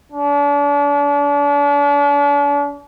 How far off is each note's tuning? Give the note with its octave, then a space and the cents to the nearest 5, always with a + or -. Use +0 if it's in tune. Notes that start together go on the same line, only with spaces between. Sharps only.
D4 -40